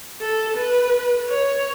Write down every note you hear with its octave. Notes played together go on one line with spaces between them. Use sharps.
A4
B4
C#5